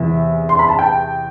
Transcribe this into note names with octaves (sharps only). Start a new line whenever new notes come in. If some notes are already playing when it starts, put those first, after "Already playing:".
Already playing: E2 C3 E3 E5
C6
B5
A5
G5